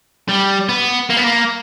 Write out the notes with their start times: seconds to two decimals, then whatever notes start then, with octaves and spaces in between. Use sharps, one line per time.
0.29 G3
0.69 B3
1.10 A#3
1.17 B3
1.24 A#3